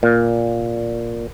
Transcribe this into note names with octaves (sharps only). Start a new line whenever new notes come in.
A#2